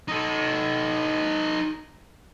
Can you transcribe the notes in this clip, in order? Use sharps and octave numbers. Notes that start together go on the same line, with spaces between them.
D#4 A4